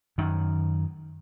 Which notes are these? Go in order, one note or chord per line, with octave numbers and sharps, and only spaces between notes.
F#2 D#3